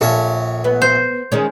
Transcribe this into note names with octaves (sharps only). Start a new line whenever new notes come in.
A#1 C#4 A4 E5
B3
C5
D#3 G#3 C#4